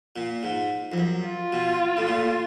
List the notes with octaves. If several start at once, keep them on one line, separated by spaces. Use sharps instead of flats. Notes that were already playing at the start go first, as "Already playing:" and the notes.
A#2
G#2
F2
F#2
F4
B2
A2
A#2